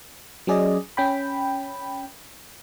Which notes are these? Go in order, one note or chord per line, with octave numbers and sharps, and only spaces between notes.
F#3 C#4 G#4 D5 D#5
C#4 G5 B5